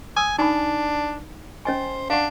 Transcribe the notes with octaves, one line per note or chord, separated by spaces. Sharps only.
G#5 D#6 E6
D4 D#4 G#5 B5
C#4 C5 D#5 G#5
D4 F5 F#5